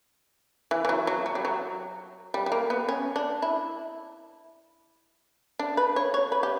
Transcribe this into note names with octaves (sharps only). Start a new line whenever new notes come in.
E3
E3
F#3
F#3
F#3
G3
F#3
G3
G3
A#3
B3
C#4
D4
E4
D4
B4
C#5
C#5
B4
G4